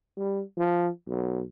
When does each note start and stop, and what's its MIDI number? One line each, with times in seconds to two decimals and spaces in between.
0.17 0.42 55
0.58 0.88 53
1.07 1.43 35